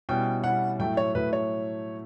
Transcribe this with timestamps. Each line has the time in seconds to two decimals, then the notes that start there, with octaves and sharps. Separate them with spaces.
0.09 B2 G3 C#4 E4 G5
0.44 B2 G3 C#4 E4 F#5
0.79 A2 F#3 A3 E4 G5
0.97 C#5
1.15 A2 F#3 A3 E4 B4
1.33 C#5